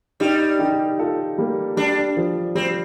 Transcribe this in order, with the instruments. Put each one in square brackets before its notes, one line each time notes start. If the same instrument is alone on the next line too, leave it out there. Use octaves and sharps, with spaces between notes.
[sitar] G3 [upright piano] D#4 G4
[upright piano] D#4 G4
F4 A4
G3 A#3
[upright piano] G3 [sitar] D4
[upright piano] F3
[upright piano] G3 [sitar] C4